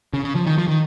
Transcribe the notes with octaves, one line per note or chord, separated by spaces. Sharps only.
C#3
C#3
F3
D#3
F3
D#3